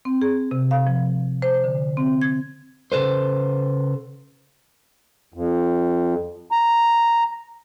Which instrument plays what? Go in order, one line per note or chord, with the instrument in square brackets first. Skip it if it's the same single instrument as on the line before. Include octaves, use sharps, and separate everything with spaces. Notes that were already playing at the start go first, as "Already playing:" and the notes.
[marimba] C4
G#4
C3
F5
F3
C5
D3
C4
G#6
[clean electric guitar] C#3 A4 B4 C5
[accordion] F2
A#5